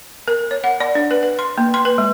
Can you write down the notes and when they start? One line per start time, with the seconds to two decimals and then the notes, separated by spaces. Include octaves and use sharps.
0.28 A#4
0.51 C#5
0.64 F#5
0.80 D5
0.95 D4
1.11 B4
1.23 B4
1.39 C6
1.58 A#3
1.74 C6
1.85 B4
1.98 G#3